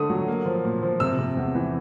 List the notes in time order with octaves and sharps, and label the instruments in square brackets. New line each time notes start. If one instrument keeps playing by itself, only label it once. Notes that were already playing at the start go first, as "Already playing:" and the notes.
Already playing: [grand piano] D3 A3 D#6
F#3
A#3
F3
A#2
F3
C3 E6
C3
E2
E3